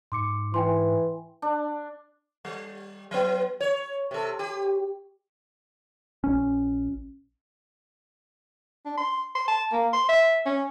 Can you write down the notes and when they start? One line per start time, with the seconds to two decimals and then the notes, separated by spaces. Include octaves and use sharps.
0.12 G#2 C6 D6 C#7
0.54 E3 G5 G#5 C6
1.42 D4
2.45 G3
3.11 F#3 B3
3.61 C#5
4.11 C3 A4
4.39 G4
6.24 A#1 C#4
8.86 D4
8.98 C6
9.35 C6
9.48 A5
9.72 A#3
9.93 C6
10.09 E5
10.46 C#4